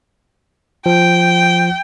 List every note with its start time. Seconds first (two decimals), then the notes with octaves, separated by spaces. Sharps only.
0.86 F3 G5